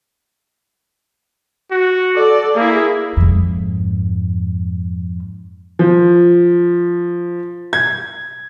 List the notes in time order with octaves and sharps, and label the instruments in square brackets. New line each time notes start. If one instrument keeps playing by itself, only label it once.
[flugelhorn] F#4
[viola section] A4 D5
[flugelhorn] A#3 [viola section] E4 G#4
[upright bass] F2 G#2
[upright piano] F3
G#6